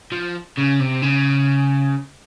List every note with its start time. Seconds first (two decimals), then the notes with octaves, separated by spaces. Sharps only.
0.12 F3
0.57 C#3
0.80 C3
1.02 C#3